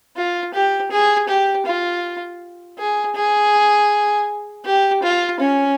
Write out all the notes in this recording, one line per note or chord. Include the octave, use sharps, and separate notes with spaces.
F4
G4
G#4
G4
F4
G#4
G#4
G4
F4
C#4